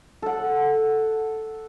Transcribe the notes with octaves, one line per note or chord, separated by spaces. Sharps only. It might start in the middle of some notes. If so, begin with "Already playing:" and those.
A4 F#5